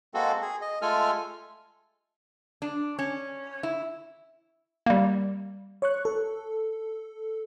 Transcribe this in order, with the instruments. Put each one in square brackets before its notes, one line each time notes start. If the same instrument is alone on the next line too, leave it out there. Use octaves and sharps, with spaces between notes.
[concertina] G#3 A#3 C4 F#4 A4
G#4
D#5
G#3 A3 F4 A4 G#5 F6
[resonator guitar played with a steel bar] D4
C#4
E4
[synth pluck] G3 A#3
[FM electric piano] C#5 C#6 F#6
A4